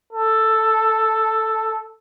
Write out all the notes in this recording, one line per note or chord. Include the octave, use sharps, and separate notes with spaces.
A4